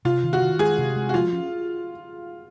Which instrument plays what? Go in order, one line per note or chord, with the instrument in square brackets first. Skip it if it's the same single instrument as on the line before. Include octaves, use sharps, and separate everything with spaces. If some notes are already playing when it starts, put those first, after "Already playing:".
[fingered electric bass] C3 [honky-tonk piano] F4
[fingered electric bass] D#3
[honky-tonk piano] F#4
[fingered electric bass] D#3
[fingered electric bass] G#3 [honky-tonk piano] G#4
[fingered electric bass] C3
G#3
[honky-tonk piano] F#4
[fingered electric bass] F3 [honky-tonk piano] F4
[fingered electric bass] C#4